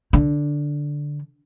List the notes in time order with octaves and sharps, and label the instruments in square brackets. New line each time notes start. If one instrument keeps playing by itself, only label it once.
[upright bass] D3